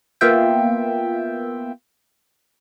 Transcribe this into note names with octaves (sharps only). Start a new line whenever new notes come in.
A#3 B3 F4 E5 G5